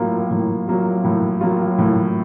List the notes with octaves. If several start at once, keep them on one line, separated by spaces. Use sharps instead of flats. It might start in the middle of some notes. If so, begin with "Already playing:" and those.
Already playing: A2 F#3 A#3 F4
A2
F#3 A#3 F4
A2
F#3 A#3 F4
A2